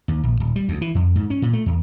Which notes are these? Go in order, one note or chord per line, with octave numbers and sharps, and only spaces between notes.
D#2
A#1
D#1
G3
D2
E3
F2
G#2
C#4
A#2
A3
E2